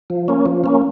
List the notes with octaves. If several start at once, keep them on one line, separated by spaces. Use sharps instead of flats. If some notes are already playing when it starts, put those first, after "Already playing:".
F3
A#3 C#4
F3
A#3 C#4